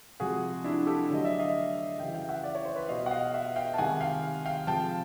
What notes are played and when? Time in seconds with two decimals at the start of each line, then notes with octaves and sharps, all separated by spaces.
0.20 C3 F3 G#3 F#4 G#4
0.64 D4 E4
0.87 G4 A4
1.10 D3 F#3 A3 D#5
1.25 D5 E5
1.39 D#5 F5
1.99 C#3 E3 G3 F5 G5
2.14 F5 G5
2.28 E5 F#5
2.44 D5
2.55 C#5
2.65 C5
2.75 B4 C#5
2.88 B2 G3 D#5 F5
3.06 F#5
3.11 D#5 F5
3.34 E5 F#5
3.56 F5 G5
3.74 A5
3.78 C3 D#3 G#3 F#5 G#5
4.01 F5 G5
4.45 F5 G5
4.67 C3 F3 G#3 G5 A5